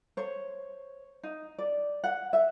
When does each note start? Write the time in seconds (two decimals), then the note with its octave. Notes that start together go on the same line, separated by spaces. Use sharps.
0.17 C5 C#5
1.23 D#4
1.59 D5
2.04 F#5
2.33 E5